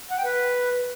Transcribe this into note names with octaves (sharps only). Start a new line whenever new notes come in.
F#5
G5
B4